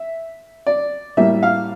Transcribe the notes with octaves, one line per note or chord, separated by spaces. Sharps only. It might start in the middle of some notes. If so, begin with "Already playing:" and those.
Already playing: E5
D5
A2 G3 A#3 E5
F5